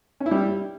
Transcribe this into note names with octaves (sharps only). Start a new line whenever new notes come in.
C#4
E4
G3